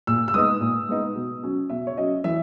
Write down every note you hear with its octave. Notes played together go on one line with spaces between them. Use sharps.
A#2 E6
E6
G#3 B3 D#4 D#6
A#2
G#3 B3 D#4
B2
F#3 C#4
B2 E5
C#5
F#3 C#4 D#5
E3 E5